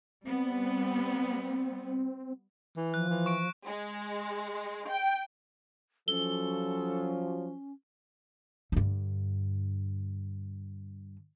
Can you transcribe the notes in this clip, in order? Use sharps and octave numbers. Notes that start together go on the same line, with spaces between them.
G3 B3 C4
E3
F3 F#6
E3
C#6 D7
G#3
G5
F3 F#3 C#4 A4 G7
G2 D3